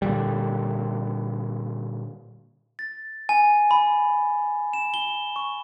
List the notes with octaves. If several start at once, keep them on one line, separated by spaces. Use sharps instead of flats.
A#2 D3 G3
A6
G#5
B5
E7
G7
C#6